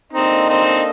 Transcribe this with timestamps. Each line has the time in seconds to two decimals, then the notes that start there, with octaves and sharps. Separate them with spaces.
0.13 A#3 C4 D4 D#4 A4 D#5
0.49 C4 D#4